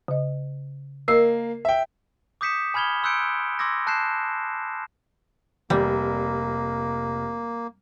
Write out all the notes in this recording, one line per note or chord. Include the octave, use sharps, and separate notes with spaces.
C#3 D#5
A#3 A#4 D#5 E6 C7
E5 G5
D6 D#6 G6 B6 C#7 E7
G#5 B5 F6 G#6 F7 G7
C6 E6 F#6 G6 C#7 D7
C6 D6 E6 G#6 A#6
A5 F#6 G6 C7 E7
F1 G3 A#3